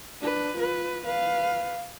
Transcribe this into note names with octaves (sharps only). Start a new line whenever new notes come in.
D4 B4
F4 B4
B4 F5